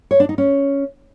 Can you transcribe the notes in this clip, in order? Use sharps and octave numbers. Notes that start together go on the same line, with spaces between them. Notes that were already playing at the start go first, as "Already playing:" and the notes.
C#5
D4
D#4
C#4